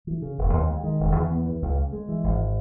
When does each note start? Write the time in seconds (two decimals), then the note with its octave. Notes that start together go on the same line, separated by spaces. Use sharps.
0.07 E3
0.22 C#3
0.38 E1
0.53 D#2
0.69 G#3
0.84 D#3
1.00 E1
1.15 E2
1.31 B3
1.46 E3
1.62 C#2
1.77 C#3
1.93 G#3
2.09 E3
2.23 G#1